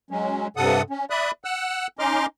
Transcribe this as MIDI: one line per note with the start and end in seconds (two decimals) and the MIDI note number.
0.11 0.47 54
0.11 0.47 56
0.11 0.47 61
0.57 0.82 43
0.57 0.82 48
0.57 0.82 69
0.57 0.82 78
0.57 0.82 87
0.90 1.05 61
1.10 1.31 74
1.10 1.31 76
1.10 1.31 83
1.10 1.31 87
1.10 1.31 90
1.44 1.87 78
1.44 1.87 88
1.44 1.87 90
1.99 2.26 61
1.99 2.26 63
1.99 2.26 75
1.99 2.26 84
1.99 2.26 86
1.99 2.26 89